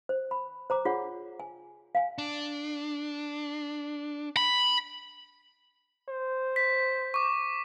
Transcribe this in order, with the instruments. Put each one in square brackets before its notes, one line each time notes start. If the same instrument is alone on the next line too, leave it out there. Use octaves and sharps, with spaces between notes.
[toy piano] C5
B5
C5 A#5 D6
F4 G#4 C#5 F#5
G#5
F5 G#5
[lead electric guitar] D4
[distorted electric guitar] B5
[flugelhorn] C5
[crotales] B6
C#6 D6